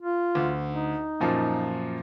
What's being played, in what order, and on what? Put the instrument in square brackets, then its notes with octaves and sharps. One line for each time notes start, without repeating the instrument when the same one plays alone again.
[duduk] F4
[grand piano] D2
[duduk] D#4
[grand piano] F#2 A#2 F3